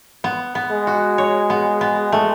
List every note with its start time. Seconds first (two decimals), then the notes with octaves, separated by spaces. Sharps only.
0.24 B3
0.55 B3
0.71 G#3
0.87 F#4
1.18 C#5
1.50 B3
1.81 B3
2.12 A3